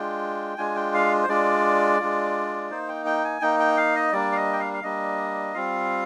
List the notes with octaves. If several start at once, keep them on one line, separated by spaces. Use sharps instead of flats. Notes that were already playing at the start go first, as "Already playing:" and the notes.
Already playing: G#3 D4 F4 G5
G#3 D4 F4 G#5
G5
F5
C5
G#3 D4 F4 D5
G#3 D4 F4
A#3 D#4 C5
G5
G5
G#5
A#3 D#4 G5
G5
F5
D#5
G3 A#3 D4 D5
F5
D#5
G5
F5
F5
G3 A#3 D4 D#5
G3 C4 F4 F5